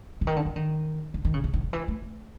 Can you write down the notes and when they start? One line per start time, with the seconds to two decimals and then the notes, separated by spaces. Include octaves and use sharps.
0.21 D3
0.27 D#3
0.36 D3
0.46 E3
0.56 D#3
1.14 D3
1.25 D#3
1.34 C#3
1.44 D3
1.53 D#3
1.64 D#3
1.73 E3
1.88 A3